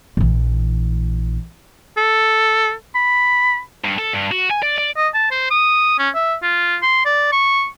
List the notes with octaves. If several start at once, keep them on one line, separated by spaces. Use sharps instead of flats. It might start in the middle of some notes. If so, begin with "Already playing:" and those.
A#1 E3
A4
B5
G2
A4
G2
F#4
G#5
D5
D5
D#5
A5
C5
D#6
C#4
E5
F4
C6
D5
C#6